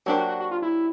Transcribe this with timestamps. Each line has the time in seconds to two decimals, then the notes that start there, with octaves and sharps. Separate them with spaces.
0.06 F#3 A#3 D4 F#4 G4 C5
0.17 F#4
0.28 F#4
0.40 F#4
0.51 F4
0.62 E4